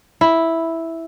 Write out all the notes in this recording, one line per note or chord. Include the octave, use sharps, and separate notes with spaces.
E4